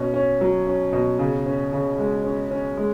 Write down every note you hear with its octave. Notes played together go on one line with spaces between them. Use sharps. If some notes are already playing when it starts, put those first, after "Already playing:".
Already playing: B2 C#4
C#4
F#3
C#4
B2
C#3
C#4
C#3
G#3
C#4
C#4
G#3